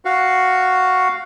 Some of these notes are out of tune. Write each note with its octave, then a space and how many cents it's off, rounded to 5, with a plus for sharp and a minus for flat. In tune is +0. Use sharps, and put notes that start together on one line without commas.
F#4 +0 F5 +0 C#6 +0